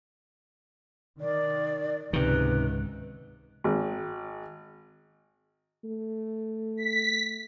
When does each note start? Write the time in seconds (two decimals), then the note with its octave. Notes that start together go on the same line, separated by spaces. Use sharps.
1.21 D#3 D5
2.13 C#2 G#2 C3 D#3 B4
3.64 G#1
5.84 A3
6.77 B6